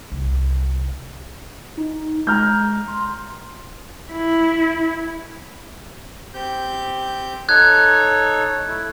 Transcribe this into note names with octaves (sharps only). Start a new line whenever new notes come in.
C2
D#4
G#3 A#5 F6 G6
C6
E4
C4 G4 G6
D#4 A4 C#5 F#6 G#6
A3 E4